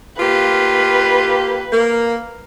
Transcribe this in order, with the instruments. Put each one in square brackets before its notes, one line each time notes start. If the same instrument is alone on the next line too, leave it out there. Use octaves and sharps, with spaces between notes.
[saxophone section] A#3 F4 G4 [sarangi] B4
[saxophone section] A#3